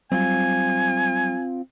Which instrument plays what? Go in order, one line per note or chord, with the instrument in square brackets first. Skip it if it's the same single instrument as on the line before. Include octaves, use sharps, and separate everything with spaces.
[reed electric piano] F#3 G3 [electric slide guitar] C4 F4 [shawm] G#5